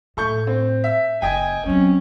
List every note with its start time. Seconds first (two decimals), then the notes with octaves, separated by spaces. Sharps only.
0.17 A2 A3 C#6 G6
0.47 C4
0.84 E5
1.22 F#1 D#5 G5 G#5
1.66 F#3 C4 C#4